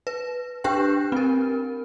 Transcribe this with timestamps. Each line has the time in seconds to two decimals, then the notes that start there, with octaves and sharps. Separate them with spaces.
0.07 B4
0.64 D4 G4 B4 G5
1.12 C4 A#4